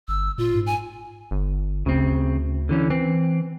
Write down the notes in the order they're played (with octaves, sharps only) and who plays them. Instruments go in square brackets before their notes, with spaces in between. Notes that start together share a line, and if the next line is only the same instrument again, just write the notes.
[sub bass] G1 [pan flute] E6
[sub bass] A#2 [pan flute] F4
[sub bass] G#2
[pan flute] G#5
[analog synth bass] G1
[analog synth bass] D2 [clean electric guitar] C#3 C4
[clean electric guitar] D3 E3 C#4
[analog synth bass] E3 [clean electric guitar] C4